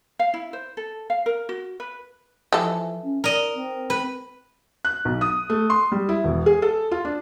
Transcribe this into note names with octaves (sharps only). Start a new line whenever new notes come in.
F5
E4
C5
A4
F5
A#4
F#4
B4
E3 F3 A4
C#4
A#4 D5 D#5
C4
B4
F#6
B1
D#6
A3
C6
G3
E4
E1
G#4
A4
F4
D4